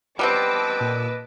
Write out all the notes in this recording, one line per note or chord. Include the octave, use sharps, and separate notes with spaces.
G3 B3 C4 B4 D#5 A5 D6 E6
A#2